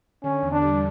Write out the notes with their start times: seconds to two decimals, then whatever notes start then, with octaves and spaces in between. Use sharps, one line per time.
0.24 D3 C#4
0.42 E2
0.52 D4
0.62 G3